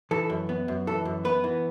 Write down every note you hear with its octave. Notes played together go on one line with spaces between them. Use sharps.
E3 A4
F#2
B3
F#2
E3 A4
F#2
B3 B4
E3